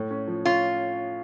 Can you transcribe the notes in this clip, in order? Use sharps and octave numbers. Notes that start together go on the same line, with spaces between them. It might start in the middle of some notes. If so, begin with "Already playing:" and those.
Already playing: A2
C#4
F3
C#4 F4